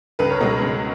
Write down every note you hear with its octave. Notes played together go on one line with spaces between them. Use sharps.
C#2 B4
A#4 C#5
B2 G#3 B4 D#5
C#2